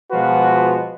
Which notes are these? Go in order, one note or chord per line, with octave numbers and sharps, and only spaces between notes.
B2 F3 G#3 F4 F#4 B4